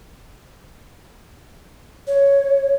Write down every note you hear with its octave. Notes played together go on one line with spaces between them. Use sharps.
C#5